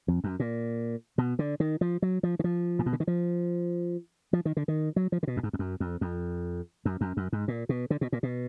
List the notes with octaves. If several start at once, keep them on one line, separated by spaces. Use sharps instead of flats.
F2
F#2
A#2
B2
D3
D#3
F3
F#3
F3
D#3
F3
A#2
B2
D3
D#3
F3
F3
D#3
D3
D#3
F#3
F3
D3
B2
F#2
G#2
F2
F#2
F2
F2
F#2
F#2
F#2
G#2
A#2
B2
D3
B2
A#2
B2